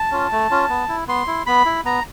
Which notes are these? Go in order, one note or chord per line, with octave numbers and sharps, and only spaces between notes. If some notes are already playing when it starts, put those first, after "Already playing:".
Already playing: A5
C#4 F4
A3
C#4 F4
B3
E4
B3 C6
E4
B3 B5
E4
B3 A#5